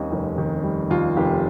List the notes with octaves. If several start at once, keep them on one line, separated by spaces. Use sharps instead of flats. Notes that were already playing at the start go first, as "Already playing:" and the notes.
Already playing: D#2 D#3 G3 C4 C#4 D#4
F1
D#3
G3
D#2 F4
F1 G4